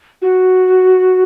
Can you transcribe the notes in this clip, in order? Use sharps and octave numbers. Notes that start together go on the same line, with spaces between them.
F#4